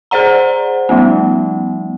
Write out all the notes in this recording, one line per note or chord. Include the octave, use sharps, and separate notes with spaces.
G#4 C5 D5 F#5 A#5
F3 G3 A3 B3